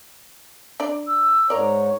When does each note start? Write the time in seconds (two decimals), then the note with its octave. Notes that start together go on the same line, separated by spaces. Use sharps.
0.80 D4 D#4 D5
1.07 E6
1.50 G#2 A#4 C#5 D5 A#5